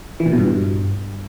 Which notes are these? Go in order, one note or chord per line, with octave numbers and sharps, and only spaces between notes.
E3
A#2
B2
G2